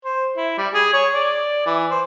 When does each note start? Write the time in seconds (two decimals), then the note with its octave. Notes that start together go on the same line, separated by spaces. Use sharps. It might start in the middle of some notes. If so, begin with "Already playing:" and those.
0.05 C5
0.37 E4
0.58 G3
0.73 G#4
0.93 C#5
1.14 D5
1.66 E3
1.91 C5